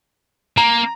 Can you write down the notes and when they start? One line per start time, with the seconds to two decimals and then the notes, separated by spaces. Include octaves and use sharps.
0.58 A#3 A#5